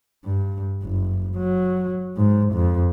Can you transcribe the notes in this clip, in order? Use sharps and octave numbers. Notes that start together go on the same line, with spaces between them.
G2
F#1
F#3
G#2
F2